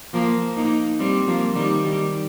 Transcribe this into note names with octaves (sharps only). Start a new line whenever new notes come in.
F3 A#3
A#3 D#4
G3 C4
F3 A#3
D#3 G3
D#3 G3